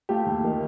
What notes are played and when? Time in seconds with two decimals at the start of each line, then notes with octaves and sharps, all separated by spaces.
0.09 A3 F4 G4
0.26 D#2
0.44 D#3